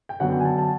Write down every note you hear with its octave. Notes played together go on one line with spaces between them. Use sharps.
G5
F#2 D3 F#3 B3 F#5
G5
G#5
A5
A5